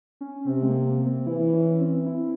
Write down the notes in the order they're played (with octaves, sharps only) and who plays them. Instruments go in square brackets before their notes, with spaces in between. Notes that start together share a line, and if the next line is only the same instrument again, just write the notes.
[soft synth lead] C#4
[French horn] C3 [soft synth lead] C4
[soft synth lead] G#3
A#3
A#3
A#3
C4
[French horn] E3 [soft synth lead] E4
[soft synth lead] E4
C#4
C#4
C4
E4